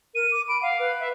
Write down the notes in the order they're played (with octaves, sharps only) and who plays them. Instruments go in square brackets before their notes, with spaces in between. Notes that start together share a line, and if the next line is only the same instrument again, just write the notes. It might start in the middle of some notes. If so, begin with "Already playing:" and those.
[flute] A#4 [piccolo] D#7
[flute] D6
[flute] B5 [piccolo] D7
[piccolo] F5 [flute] F#5
[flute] B4
[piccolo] E5